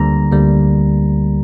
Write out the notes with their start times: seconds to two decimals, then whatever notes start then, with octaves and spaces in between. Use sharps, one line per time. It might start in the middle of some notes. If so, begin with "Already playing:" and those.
Already playing: D2 D3 G3 A#3 A#5
0.32 D2 D3 G3 A#3